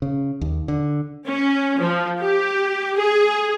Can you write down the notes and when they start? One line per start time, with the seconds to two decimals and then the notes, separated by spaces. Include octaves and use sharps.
0.02 C#3
0.41 D#2
0.68 D3
1.28 C#4
1.81 F3
2.20 G4
2.98 G#4